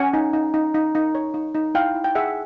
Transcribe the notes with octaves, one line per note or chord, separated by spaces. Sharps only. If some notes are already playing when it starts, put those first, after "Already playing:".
Already playing: C#4 F#5 G#5
D#4
D#4
D#4
D#4
D#4
C#5
D#4
D#4
E4 F5 G5
E4
G5
G#4 E5 F#5